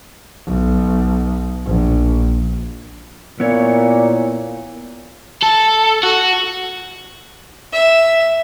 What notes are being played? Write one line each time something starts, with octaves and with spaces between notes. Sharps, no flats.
B1
A#1
A#2 B3 E4 C#5
A4
F#4
E5